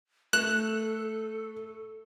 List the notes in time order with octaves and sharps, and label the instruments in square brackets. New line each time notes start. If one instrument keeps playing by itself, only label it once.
[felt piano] A3 E7 [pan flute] A4 [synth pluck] F#6